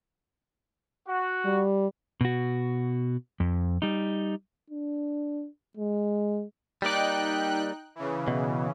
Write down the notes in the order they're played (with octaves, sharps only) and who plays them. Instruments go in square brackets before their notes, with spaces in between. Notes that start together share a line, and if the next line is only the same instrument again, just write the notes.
[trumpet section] F#4
[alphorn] G3
[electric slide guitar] B2 F#4
F2
G3 D#4
[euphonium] D4
G#3
[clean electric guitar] G3 A#3 D5 [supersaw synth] D#4 G5 F#6
[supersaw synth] C#3 E3
[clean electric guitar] B2